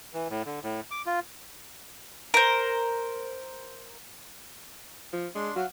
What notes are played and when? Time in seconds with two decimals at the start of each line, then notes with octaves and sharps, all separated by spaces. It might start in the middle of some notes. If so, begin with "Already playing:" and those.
0.13 E3
0.30 A2
0.46 D3
0.63 A2
0.91 D6
1.06 F4
2.34 A#4 C5
5.13 F3
5.35 G#3 D4 C6
5.56 F#3 F#4 F5